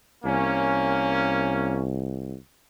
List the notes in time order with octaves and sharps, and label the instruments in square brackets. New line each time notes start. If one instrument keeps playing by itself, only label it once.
[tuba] C2 [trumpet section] A#3 C#4